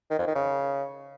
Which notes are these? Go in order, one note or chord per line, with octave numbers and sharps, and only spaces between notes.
D#3
F2
D#3
C#3